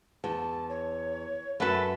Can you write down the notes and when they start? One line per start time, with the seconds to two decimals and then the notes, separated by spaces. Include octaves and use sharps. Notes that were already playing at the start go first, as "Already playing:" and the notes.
0.24 E2 A5
0.70 C#5
1.60 F#2 A3 A4 B4 A5 B5